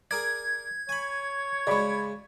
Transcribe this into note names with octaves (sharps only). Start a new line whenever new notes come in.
G#4 A#4 D5 G#6
C#5 G#5 B5
C#3 G#3 D5 B5 C#6